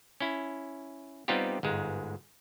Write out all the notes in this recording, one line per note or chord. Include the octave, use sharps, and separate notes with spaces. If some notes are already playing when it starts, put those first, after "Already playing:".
C#4 E4
G3 B3 C4 D#4 F4 G4
G1 G#2 G#3